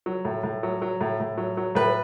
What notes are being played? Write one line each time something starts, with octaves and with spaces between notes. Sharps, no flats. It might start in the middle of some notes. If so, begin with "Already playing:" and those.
F#3
A2
A2
F#3
F#3
A2
A2
F#3
F#3
A2 B4